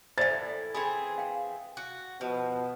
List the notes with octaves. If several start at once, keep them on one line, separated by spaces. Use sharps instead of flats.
A2 E3 C5 D5 E5 A6
E3 C4 G#4 B5
F5 G5
F#4
B2 F3